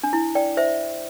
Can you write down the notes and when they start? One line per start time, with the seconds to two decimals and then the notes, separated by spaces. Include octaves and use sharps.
0.03 D4
0.13 E4
0.35 D5 G5
0.57 C5 E5